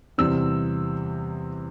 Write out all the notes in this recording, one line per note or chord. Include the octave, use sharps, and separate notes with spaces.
E2 C3 G3 C4 E6